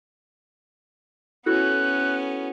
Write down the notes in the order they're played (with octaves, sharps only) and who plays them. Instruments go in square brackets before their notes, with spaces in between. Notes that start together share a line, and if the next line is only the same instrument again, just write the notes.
[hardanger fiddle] B3 C#4 [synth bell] E4 F#4 A4 [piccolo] F#6